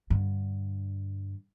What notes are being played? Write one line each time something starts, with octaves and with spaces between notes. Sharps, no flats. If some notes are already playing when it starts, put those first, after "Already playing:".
G2 D3